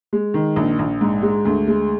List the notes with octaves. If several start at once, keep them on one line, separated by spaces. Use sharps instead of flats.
G#3
D#3
A#1
A#1
G#2
G#3
D2
G#3